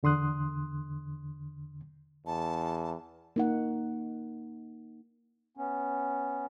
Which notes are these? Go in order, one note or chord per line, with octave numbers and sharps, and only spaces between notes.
E2 D3 C6 D#6 F#6
E2 A5
A#3 D#4 F#5
B3 C#4